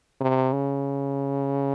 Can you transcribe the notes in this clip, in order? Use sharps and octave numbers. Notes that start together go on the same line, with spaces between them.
C3
C#3